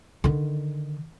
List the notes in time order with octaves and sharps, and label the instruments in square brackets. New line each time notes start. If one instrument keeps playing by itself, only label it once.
[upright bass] D3 D#3